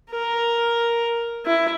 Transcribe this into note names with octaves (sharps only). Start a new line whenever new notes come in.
A#4
E4